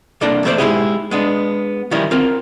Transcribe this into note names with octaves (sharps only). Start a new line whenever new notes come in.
C2 A#3 D4 A4 D5 A#5
E2 A3 E4 G4 C5 D5
G#3 A#3 D#4 E4 G4 G#4
G#3 B3 D4
D#3 F3 G3 C#4 E4 A#4
C4 F4 A#4 A#5